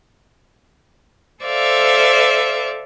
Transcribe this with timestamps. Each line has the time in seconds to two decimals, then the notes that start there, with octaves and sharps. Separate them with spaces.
1.43 A4 C5 D5 E5 F5